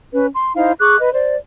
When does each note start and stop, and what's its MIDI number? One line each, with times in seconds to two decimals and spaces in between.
0.13 0.27 61
0.13 0.27 71
0.34 0.53 84
0.56 0.72 63
0.56 0.72 64
0.56 0.72 72
0.56 0.72 77
0.80 0.97 68
0.80 0.97 85
0.80 0.97 86
0.80 0.97 90
0.98 1.12 71
0.98 1.12 75
1.13 1.35 72
1.13 1.35 74